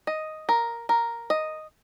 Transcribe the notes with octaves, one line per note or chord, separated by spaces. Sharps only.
D#5
A#4
A#4
D#5